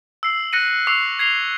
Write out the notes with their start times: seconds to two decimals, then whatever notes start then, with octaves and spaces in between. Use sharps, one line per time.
0.23 E6 C7 F#7
0.53 F#6 A#6 C#7 D#7
0.87 C#6 D6 E6 C7 F7
1.19 G#6 C7 F7 G7